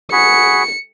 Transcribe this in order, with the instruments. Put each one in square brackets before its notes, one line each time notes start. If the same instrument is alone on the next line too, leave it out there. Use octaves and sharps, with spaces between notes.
[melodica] F#4 G#4 B5 [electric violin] C#7